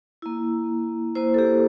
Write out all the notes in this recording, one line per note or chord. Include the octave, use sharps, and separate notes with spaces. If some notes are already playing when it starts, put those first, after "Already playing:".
A#3 E4
A#3 E4 C5
A4
G4